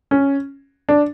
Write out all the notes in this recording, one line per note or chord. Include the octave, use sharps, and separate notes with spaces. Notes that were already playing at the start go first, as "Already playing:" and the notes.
C#4
D4